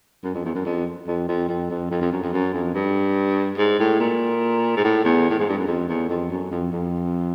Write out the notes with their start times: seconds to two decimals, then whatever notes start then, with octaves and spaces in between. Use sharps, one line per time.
0.24 F#2
0.35 F2
0.45 E2
0.55 F#2
0.66 F2
1.08 F2
1.29 F2
1.49 F2
1.70 F2
1.91 F2
2.01 F2
2.12 F#2
2.23 F2
2.33 F#2
2.54 F2
2.75 G2
3.58 G#2
3.80 A2
4.00 A#2
4.77 G#2
4.84 A2
5.05 E2
5.30 A2
5.39 G#2
5.49 G2
5.58 F#2
5.67 F2
5.89 E2
6.09 F2
6.31 F#2
6.51 F2
6.72 F2